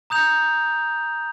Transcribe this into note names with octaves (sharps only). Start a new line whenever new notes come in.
A#5 D#6 G6 F7